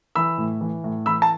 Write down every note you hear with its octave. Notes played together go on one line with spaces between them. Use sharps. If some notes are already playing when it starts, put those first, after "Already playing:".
E3 B5 E6
A2
E3
A2
E3 B5 E6
A5